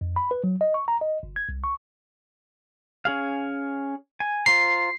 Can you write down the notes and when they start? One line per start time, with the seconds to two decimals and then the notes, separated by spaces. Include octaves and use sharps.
0.01 F2
0.16 B5
0.31 B4
0.44 F#3
0.61 D#5
0.74 C#6
0.88 A#5
1.01 D#5
1.23 G1
1.36 G#6
1.49 C2
1.64 C#6
3.05 C#4 G#4 F5
4.20 G#5
4.46 F4 C5 A#5 C7